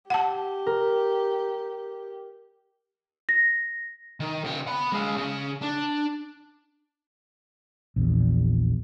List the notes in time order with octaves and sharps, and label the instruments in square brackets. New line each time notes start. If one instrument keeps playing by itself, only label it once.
[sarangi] G4 [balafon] F#5 A5
[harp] A#4
[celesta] A#6
[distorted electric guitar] D#3
C#3 G5
F#5 B5
G#3 F5
C#3
D4
[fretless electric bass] A#1 E2